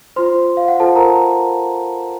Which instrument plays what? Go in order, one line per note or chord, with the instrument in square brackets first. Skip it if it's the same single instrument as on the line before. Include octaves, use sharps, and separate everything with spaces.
[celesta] F4 C5 C6
F5
F#5
F4 A4 C5 A5
A#4 A#5